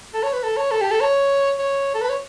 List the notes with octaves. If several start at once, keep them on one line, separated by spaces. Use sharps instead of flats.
A4
C#5
B4
A4
C#5
A4
G4
A4
C#5
C#5
A4
B4
C#5